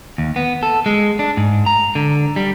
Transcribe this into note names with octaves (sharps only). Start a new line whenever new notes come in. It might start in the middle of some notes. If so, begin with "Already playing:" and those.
D#2
B3
A4
G#3
D4
G#2
A#5
D3
G3